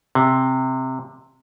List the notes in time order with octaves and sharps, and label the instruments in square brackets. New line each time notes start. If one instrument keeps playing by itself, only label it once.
[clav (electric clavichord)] C3